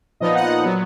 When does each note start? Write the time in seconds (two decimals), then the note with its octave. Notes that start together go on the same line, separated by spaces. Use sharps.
0.20 A#2 F3 B3 D#4 D#5
0.35 F#5
0.63 A#2 F#3 B3